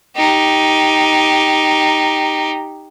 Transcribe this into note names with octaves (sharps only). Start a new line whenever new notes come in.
D#4 G4